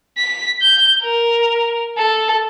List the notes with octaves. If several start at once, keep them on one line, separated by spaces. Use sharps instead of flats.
B6
G6
A#4
A4